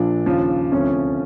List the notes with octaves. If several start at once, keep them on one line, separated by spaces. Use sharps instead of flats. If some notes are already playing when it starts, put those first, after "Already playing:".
Already playing: A#1 A#2 F3 D4
D#2 C#3 F3
D2 C3 F3 C#4